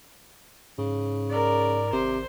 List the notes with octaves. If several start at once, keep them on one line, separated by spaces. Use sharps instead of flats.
G#2 C#3
A#4 D5
G#1 C3 C5